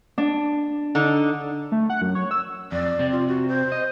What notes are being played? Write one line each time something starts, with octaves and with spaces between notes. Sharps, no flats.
D4
D3 D#4
A3
F#5
F#2
C#5
E6
F2 D5
C3 C4
F4
F#4
C5
D#5